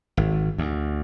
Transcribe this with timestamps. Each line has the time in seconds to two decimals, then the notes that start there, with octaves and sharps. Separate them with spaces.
0.17 G#1
0.58 D2